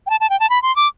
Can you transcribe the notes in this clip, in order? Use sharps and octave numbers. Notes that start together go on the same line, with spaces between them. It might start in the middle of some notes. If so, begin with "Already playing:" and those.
G5
A5
A5
G5
A5
B5
C6
D6